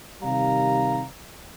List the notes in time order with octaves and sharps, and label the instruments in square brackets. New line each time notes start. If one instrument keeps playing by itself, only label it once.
[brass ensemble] C3 D#3 G3 F5 A#5